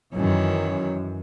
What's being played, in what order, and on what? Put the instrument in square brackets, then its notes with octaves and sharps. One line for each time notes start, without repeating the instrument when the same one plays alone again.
[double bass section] F#2 [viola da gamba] D#3 E3 C#5